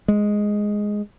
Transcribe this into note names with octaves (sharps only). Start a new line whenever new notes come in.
G#3